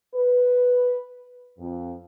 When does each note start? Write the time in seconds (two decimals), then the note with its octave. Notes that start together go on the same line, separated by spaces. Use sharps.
0.15 B4
1.59 F2